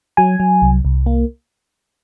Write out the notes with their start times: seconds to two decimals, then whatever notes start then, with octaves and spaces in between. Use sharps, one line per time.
0.17 F#3 G#5
0.40 F#3
0.62 C2
0.85 C2
1.06 A#3